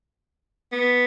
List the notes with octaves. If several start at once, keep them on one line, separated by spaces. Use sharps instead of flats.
B3